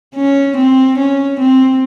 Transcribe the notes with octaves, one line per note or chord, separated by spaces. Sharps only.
C#4
C4
C#4
C4